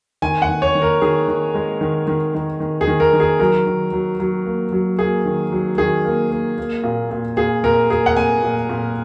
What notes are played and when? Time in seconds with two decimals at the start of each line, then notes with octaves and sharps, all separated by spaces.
0.22 D#3 G#5
0.42 F#5
0.49 D#3
0.62 C#5
0.75 D#3
0.82 A#4
1.01 D#3 G#4
1.28 D#3
1.55 G#3
1.81 D#3
2.07 D#3
2.35 D#3
2.60 D#3
2.81 G#4
2.87 D#3
3.00 A#4
3.13 D#3
3.20 G#4
3.40 F#3 A#4
3.66 D#3
3.93 F#3
4.20 F#3
4.46 A#3
4.72 F#3
4.99 A#3 G#4
5.25 D#3
5.52 F#3
5.78 D#3 G#4
6.05 A#3
6.31 A#3
6.58 A#3
6.84 A#2
7.11 A#2
7.37 A#2 G#4
7.64 A#2 A#4
7.90 A#3 G#4
8.06 F#5
8.16 A#2 G#5
8.43 A#2
8.69 A#2